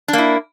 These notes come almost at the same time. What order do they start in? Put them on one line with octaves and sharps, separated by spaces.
D4 A#3 E4